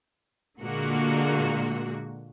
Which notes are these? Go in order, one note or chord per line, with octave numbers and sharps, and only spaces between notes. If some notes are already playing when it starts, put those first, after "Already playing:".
A#2 D3 G#3 A#3 F#4